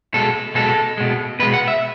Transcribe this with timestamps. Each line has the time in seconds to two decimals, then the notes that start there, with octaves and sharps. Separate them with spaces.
0.14 B2 G#3 A4
0.55 B2 G#3 A4
0.97 B2 G#3
1.39 B2 B4
1.43 G#3
1.54 F#5
1.68 E5